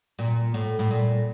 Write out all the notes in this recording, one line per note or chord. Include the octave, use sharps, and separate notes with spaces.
A#2
A2
A2
A#2